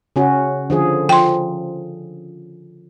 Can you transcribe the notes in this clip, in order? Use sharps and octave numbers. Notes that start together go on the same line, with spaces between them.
C#3 C#4 F#4
D3 F3 G#4
F3 G5 C6